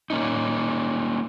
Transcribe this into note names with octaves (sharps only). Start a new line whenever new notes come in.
A#3 C#4 D#4